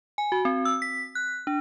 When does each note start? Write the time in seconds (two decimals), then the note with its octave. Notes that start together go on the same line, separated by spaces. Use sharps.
0.18 G#5
0.32 F#4
0.45 C4
0.65 E6
0.82 B6
1.15 F#6
1.47 D4